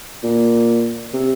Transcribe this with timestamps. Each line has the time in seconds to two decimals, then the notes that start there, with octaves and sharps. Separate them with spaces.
0.23 A#2
1.13 C3